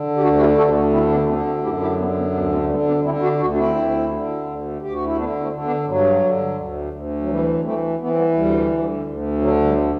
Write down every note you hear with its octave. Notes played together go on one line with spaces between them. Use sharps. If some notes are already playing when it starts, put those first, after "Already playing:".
Already playing: D3
G4
D2 D4 F#4
F#4
E4 G4
D2 F#4 A4
D3 C4 E4
B3 D4
D3 A3 C4
A3 C4
F#2 E4 G4
E4 G4
D3 G3 B3
G3 B3
D2 B3 D4
A3 C4
D3 G3 B3
B3 D4
D3 C4 E4
D4 F#4
D2 D4 F#4
D4
C4 E4
D2
D3
D2
D2 G4
F#4
E4
D3 B3 D4
A3 C4
D3
B3 D4
G2 F#3
D3
D2
D2
F#3
E3 G3
E3 A3 C4
E3 B3
C4
G3 B3
D2 G3
D2
D2
D3 F#3
G3